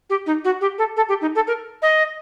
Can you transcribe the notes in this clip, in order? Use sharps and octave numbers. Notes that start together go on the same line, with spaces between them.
G4
D#4
F#4
G4
A4
A4
G4
D#4
A4
A#4
D#5